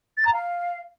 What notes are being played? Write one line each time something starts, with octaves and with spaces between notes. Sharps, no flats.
A6
A#5
F5